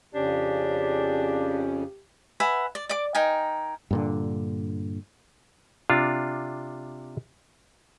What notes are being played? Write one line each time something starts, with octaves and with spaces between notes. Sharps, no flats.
F2 C#3 C#4 D4 G4
B4 E5 F#5 G#5
D5
D5 D6
D#4 A#4 G5 G#5
G2 A#2 D3
C3 D4 F4